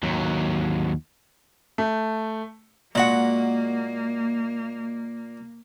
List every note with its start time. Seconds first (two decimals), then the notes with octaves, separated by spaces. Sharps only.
0.03 D#2 F#3
1.78 A3
2.95 A#2 G#3 A#3 F#4 F#5 B5